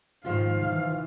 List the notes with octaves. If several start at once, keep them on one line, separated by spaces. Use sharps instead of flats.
G#2 D#3 F3 F4 F5
E3